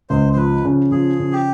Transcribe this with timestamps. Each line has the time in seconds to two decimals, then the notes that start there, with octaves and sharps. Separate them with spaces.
0.09 C#2 C5
0.33 C5
0.36 F3 B4
0.65 C#3
0.91 F3 G#4
1.19 C#3
1.32 G4